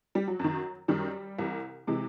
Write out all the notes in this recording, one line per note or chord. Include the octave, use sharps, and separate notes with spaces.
G3
F#3
F#2 D#3
F#2 D#3 G3
C2 C3 E3
C3 E3 G#3